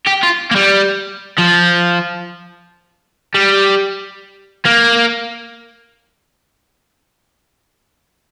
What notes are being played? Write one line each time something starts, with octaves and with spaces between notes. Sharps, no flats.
G4
F4
A#3
G3
F3
G3
A#3